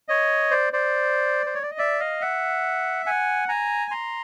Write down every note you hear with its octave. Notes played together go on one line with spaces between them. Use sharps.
C#5 D#5
C5 D5
C5 D5
C5
C#5
D5
D#5
D5 E5
D#5 F5
E5 F#5
F#5 G#5
G#5 A#5
A#5 C6